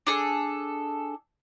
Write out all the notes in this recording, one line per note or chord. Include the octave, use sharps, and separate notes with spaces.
D4 G#4 A4